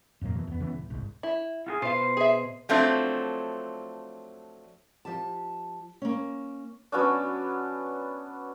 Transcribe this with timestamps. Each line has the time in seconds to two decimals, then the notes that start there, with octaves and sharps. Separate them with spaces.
0.21 F2 A#2 F#3 A#3
0.35 B2 E3
0.47 E2 B3
0.60 C#3 E3 B3
0.74 D#1
0.90 G1 C2 G#2
1.23 E4
1.67 F4 F#4 G#4
1.82 B2 F4 B4 C5 F5
2.17 G#4 E5
2.69 F3 F#3 A3 C4 D4
5.05 F3 G4 A5
6.02 A#3 C#4
6.92 F#3 B3 C#4 D4